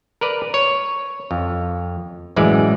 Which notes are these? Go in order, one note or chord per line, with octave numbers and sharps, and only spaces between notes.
A#4 B4 D5
C#5
F2
A1 F#2 E3 G#3 D5